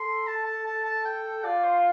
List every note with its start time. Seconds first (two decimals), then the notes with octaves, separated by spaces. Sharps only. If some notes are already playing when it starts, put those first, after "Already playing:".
Already playing: A4 C6
0.27 A5
0.46 A5
0.66 A5
0.85 A5
1.05 G5
1.44 F4 D5
1.64 C5